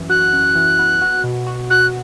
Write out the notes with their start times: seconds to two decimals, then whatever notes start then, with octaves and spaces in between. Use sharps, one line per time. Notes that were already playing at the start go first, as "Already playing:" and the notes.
Already playing: F#2 E3
0.09 F#4 F#6
0.33 F#2
0.55 E3
0.79 B3
1.02 F#4
1.24 B2
1.47 F#4
1.70 F#4 F#6